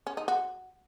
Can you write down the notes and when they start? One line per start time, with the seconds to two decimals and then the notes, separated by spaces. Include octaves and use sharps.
0.07 C#4
0.17 D#4
0.28 F#4